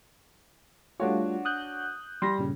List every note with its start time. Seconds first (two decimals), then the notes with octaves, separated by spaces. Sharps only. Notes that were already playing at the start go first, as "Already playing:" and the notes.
1.00 G3 A3 D4 F4 F#4 C#5
1.45 D#6 F#6 G6
2.22 G3 C6 A#6
2.38 G2 A#2 C#3